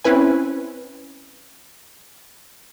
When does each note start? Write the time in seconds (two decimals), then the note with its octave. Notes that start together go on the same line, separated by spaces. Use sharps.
0.05 C4 C#4 E4 B4 G#5